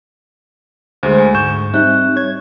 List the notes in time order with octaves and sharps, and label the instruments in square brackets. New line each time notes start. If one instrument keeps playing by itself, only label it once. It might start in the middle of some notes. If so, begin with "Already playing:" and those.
[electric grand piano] D2 G#3 [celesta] C5
[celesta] G#5
[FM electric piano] G#2 [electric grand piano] C#6 G6 [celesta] E7
[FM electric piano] G3 C4 D#4 [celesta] E5 F#6
[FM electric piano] C#5 G#6